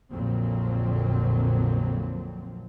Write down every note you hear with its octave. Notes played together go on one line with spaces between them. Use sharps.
A#1 F2 A#2 D3 F#3 C4